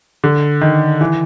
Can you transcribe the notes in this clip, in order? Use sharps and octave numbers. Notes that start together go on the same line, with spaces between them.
D3
D#3
E3